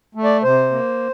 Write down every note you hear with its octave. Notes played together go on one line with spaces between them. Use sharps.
A3
D5
C3 C5
A#3